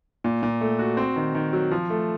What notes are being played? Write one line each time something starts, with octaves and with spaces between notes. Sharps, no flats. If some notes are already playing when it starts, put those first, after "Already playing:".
A#2
A#2
A3
F#4
C4
D#3
D#3
F#3
F3
A3